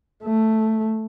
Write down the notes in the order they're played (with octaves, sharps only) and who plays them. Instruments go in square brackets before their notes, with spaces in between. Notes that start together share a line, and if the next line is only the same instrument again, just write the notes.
[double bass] A3